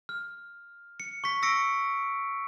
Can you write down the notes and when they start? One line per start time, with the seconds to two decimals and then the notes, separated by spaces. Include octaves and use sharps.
0.09 F6
1.00 C#7
1.24 C#6 B6
1.43 E6 A#6 C#7 D7